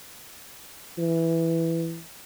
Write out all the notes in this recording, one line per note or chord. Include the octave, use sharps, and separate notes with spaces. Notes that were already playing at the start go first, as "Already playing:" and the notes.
E3